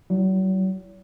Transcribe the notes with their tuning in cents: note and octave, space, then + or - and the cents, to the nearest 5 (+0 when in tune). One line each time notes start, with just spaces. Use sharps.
F#3 +40 E4 +5